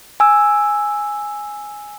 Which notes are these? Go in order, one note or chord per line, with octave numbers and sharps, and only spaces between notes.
G#5 E6